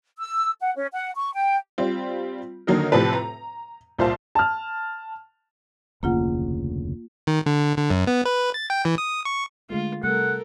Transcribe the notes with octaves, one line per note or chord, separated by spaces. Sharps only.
E6
F#5
C#4
F#5
C#6
G5
G3 C4 F4
D3 D#3 F#3 A#3 D#4 A#4
A2 C3 F3 C4 A4 B4
A#5
C2 A#2 C5 F5 A5
A5 F6
F1 D2 C#3 A#3 F4 F#5
D#3
D3
D3
F#2
B3
B4
A6
G5
E3
D#6
C#6
D3 G#3 A3 F4
C3 G3 A3 A4 A#4 F#5